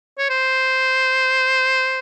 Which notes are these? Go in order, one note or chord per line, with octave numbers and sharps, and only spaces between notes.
C#5
C5